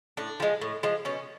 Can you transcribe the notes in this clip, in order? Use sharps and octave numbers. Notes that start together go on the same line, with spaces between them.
A2 D4
F3 G#3
A2
F3 G#3
B2 C#4